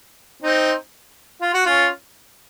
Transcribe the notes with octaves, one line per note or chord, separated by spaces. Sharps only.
C4 D#4
F4
F#4
C#4 F4